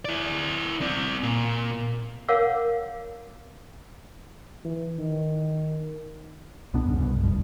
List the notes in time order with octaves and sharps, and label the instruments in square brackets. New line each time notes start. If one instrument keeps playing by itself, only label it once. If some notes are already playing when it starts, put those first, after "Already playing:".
[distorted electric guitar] E4 D5
C4 D5
A#2
[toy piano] A#4 C#5 F5 F#5 D6 E6
[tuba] E3
D#3
[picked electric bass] C2 B2 B3 D4
E2 G2 C#3
C2 G2 B2
F1 D2 G2 B2